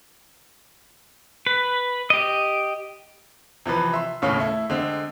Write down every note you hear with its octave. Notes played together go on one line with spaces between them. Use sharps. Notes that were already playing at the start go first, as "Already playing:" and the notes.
B4
G4 D#5
C3 E3 F3 B4
E5 C6
D#2 A2 C#3 C#4 C#5 F5
A3 E4
D3 G#3 C4